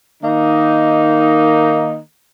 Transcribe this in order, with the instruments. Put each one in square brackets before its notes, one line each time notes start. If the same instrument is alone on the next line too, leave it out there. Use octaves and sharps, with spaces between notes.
[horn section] D#3 A#3 D#4